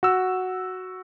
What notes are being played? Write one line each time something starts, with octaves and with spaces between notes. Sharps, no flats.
F#4 E6